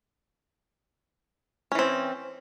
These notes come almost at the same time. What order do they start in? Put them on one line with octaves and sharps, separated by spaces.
C#4 E3 C4